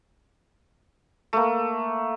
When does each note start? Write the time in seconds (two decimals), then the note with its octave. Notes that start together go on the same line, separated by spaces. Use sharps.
1.33 A3 A#3